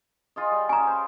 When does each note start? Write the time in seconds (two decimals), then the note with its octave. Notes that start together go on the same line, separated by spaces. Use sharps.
0.36 F4 G#4 D#5
0.51 G3
0.69 C#4 G#4 G#5 A#5
0.87 C5